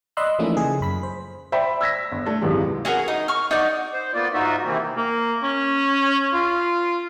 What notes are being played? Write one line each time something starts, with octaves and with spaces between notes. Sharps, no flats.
D5 D#5 B5 C6 E6 F#6
E3 F3 A3 A#3 C#4 D#4
C#3 G#4
F#2 B5 B6
C5
C5 D5 E5 G5 B5
E6 G#6 A#6 B6
G1
A3 D4
G#1 C#2 F#2 C3 E3 G#3
C#4 F#4 G#4 A#4
D#4
C#6 F6
D#4 F#4 D5
C5
A#3 B3 F4 D5
G#2 D#4 F4 F#4 E5
C3 D#3 E3 A#3 C4
A#3
C#4
F4